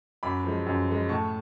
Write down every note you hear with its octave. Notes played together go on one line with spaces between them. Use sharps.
F#2 B5 D6
F3 G#3
F#2
F3 G#3
A2 A5 C#6